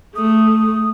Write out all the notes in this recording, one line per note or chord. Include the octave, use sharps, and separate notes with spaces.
A3 D#6